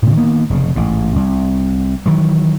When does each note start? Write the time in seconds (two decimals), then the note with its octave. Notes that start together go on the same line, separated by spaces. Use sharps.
0.02 A2 C#3
0.17 D#3 A#3 B3
0.50 F1 C#3
0.76 A1 G#2
1.16 C2
2.06 D#3 E3 F#3